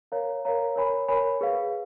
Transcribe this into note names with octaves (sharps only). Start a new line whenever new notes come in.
A#4 C#5 F5 A#5
A#4 C#5 F5 A#5
A#4 C#5 G#5 B5
A#4 C#5 G#5 B5
G#4 B4 F5